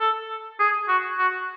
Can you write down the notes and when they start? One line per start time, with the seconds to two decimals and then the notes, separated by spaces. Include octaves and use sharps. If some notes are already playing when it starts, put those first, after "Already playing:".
0.01 A4
0.60 G#4
0.88 F#4
1.19 F#4